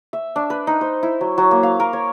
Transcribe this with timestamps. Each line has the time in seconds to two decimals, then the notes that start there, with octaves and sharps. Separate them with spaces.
0.13 E5
0.36 D4
0.50 B4
0.67 D#4
0.81 C5
1.03 E4
1.21 F#3
1.38 F#3
1.51 A#3
1.63 F5
1.80 A#4
1.93 C#5